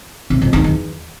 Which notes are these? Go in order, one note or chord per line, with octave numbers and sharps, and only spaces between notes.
C3
F2
D#3
E2